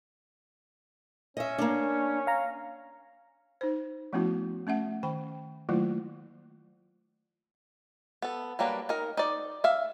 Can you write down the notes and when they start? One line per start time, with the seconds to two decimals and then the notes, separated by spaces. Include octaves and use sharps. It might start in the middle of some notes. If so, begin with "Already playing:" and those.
1.37 C#4 D#5 E5
1.58 A#3 D4
2.27 F5 A#5
3.61 D#4 C5
4.13 F3 A3 B3 C#4 E4 F#4
4.67 A3 C#4 E5 F#5
5.03 D#3 G5 B5
5.69 D#3 F#3 A3 A#3 E4 F4
8.22 B3 A4
8.59 F#3 G3 A#3 D4 B4
8.89 D#4 A#4
9.17 D#4 D5
9.64 E5 F5